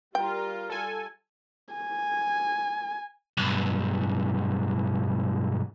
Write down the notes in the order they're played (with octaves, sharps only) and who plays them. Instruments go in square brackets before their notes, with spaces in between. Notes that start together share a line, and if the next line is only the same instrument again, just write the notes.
[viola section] G3 F4 [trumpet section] A#4 [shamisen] G5
[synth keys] A4 G#5
[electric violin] G#5
[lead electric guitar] B1 G2